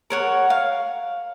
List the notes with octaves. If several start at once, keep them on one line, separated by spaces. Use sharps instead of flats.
A#4 C#5 F#5
F5